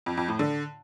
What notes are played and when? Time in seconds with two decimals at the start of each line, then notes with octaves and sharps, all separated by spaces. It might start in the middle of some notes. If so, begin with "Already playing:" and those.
0.06 F2
0.17 F2
0.28 A2
0.39 D3